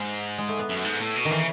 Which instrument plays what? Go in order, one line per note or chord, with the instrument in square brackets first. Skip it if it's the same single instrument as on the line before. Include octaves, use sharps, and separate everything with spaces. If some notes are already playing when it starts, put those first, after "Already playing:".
Already playing: [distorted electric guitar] G#2 [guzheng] G#3
[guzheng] G#3
A3
B3
[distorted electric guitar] F#2
G#2
A2
B2
[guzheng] D#3
[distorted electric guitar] C#3 [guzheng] E3